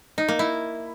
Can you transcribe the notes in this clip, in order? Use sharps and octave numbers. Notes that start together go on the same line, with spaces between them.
D#4
A#3
E4